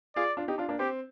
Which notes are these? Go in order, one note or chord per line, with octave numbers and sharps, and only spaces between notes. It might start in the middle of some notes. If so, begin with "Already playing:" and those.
F4 G#4 D5
D4 F4
D#4 G4
D4 F4
A#3 D4
C4 G4